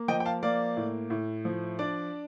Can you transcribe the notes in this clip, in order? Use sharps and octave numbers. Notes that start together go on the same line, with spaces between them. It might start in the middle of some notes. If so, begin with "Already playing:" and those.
Already playing: A#3
F3 D#5 G5
G5
F5 A5
A#3 D5 F5
A2
A2
F3
D4 D5